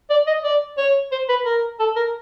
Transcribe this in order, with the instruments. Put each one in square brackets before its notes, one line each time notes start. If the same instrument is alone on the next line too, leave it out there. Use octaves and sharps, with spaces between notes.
[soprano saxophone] D5
D#5
D5
C#5
C5
B4
A#4
A4
A#4